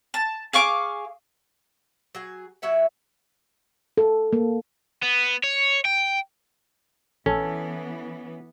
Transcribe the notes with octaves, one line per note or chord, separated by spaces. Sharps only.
A5
G#4 F5 C#6 D6
F#3 G#4
F#3 E4 E5 F#5
A4
A#3
B3
C#5
G5
A#1 E3 B3 C#4 A4 G#5